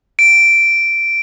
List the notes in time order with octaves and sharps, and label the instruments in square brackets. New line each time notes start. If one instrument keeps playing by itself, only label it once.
[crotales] D7